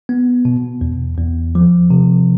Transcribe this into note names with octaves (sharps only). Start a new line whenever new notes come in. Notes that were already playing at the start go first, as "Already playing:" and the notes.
B3
B2
E2
E2
F3
C3